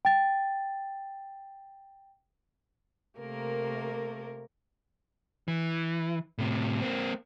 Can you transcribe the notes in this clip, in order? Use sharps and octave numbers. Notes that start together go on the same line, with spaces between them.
G5 A6
C3 A3 A#3 A#4
E3
A2 C3
A#3 C4